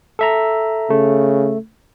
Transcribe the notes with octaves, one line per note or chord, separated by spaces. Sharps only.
A4 E5 A#5
C#3 A3